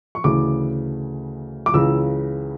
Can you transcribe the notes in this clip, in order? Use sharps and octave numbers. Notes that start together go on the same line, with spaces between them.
C#6
D2 C#3 E3 D6
D6
C#2 C#3 E3 E6